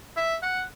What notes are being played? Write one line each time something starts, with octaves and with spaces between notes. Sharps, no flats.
E5
F#5